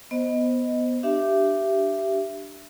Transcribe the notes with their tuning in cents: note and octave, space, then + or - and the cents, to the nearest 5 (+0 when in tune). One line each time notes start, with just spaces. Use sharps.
B3 +0 C5 +0 D#5 +0
D4 +5 G4 -15 E5 +20